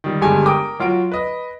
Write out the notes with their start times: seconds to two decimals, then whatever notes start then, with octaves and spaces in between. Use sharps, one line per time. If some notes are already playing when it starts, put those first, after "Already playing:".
0.04 D#3 G3
0.21 G1 G2 G#3 G4 G#5
0.46 A#4 G5 D6 D#6
0.79 F#3 F4 F#4 D7
1.12 B4 D#5